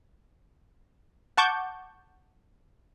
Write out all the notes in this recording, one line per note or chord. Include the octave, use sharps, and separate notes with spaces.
F#5 A5 C#6 D6 G6